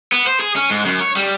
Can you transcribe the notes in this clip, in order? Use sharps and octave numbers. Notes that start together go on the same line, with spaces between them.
B3
C5
G#4
C#4
G#2
F#2
C#5
G3